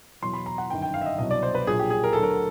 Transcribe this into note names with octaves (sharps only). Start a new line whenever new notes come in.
E2 B2 F#3 C6
B5
A#5
F#5
G1 F#2 D#3 G5
G5
F5
E5
D#5
C2 B2 F#3 D#5
D5
C5
B4
A#1 A#2 F#3 G#4
G4
G#4
A#4
D2 D3 F#3 A4
A#4